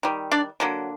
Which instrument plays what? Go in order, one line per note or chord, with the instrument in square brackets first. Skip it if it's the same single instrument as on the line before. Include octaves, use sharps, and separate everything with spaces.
[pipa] D#3 G3
D4 D5
D3 F#3 A#3